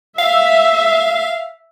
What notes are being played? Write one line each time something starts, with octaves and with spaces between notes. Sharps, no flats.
E5 F5